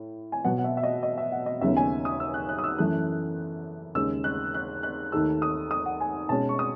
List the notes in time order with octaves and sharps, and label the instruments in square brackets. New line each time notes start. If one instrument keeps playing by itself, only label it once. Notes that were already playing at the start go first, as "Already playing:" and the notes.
Already playing: [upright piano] A2
G#5
B2 F#3 B3 F#5
F#5
E5
E5
D#5
D#5
E5
F#5
D#5
D#2 C#3 F#3 B3 E5
G#5
D#6
E6
F#6
F#6
D#6
E6
F#2 E3 A3 F#6
D#2 C#3 G#3 E6
F#6
F#6
F#6
D#2 D#3 A3 E6
D#6
D#6
F#5
G#5
B2 G#3 C#4 A5
C#6
D#6